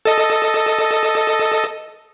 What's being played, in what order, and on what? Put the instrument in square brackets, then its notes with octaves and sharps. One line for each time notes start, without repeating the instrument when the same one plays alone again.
[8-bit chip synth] A4 D#5